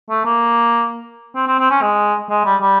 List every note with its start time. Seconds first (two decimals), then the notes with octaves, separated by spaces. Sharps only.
0.10 A3
0.25 A#3
1.35 C4
1.47 C4
1.59 C4
1.70 C#4
1.82 G#3
2.29 G#3
2.45 G3
2.61 G3